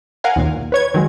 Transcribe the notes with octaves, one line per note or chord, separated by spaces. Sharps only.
A#4 F5 F#5 G#5
D#2 A#2
B4 C#5 G#6
D#3 F#3 G#3